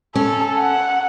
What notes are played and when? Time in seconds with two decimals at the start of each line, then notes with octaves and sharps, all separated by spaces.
0.15 C#4 A4
0.57 F#5